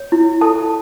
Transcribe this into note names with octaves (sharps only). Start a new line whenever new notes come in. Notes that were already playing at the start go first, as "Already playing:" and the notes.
Already playing: C#5
E4
A4 A5